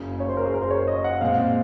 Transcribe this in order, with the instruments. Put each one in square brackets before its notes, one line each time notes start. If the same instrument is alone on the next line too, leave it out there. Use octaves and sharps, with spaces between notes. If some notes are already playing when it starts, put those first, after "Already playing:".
Already playing: [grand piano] F#1 F#2 C#3
[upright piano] C#5
C5
A#4
G#4
A#4
C5
C#5
D#5
F#5
[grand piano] A#2 G#3 C4 [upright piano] F5